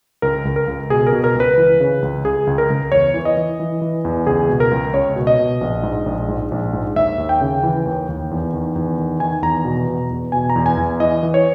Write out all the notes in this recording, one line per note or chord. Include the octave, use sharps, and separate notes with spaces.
C#2 A#4
C#2
A#4
C#2
B2 G#4
A#4
B2
A#4
C#2
B4
E3
C#3
C#2
C#2 G#4
C#2
A#4
C#2
E2 C#5
E3
D#5
E3
E3
E3
E2
C#2 G#4
B2
A#4
C#2
C#2 C#5
B2
D#5
B2
A#1
G#2
A#1
G#2
A#1
G#2
D#2 E5
D#2
G5
C#3
E3
D#2
D#2
E2
D#3
E2
D#3
D#3 G#5
E2 A#5
B2
B2
E2
B2 G#5
A#5
E2
G#5
E2
E3 D#5
E3
C#5